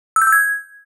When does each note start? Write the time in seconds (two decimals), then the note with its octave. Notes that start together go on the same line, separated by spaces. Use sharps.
0.16 E6
0.22 G6
0.27 E6
0.32 G#6